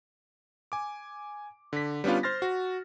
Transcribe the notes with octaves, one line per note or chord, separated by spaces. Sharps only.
G#5 D6
D3 B6
G3 B3 C#4 D4 F4
C5 C6 F6 A6 A#6
F#4